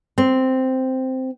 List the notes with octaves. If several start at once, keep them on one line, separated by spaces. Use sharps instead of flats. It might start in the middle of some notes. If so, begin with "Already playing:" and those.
C4